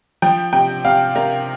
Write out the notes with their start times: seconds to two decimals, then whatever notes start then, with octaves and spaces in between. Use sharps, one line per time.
0.22 F3 G5
0.53 C3 G5
0.84 C3 F5
1.15 C3 A#4